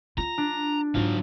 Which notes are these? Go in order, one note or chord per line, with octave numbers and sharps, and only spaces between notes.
F4 A#5
D4
G#2 F#3 F4 F5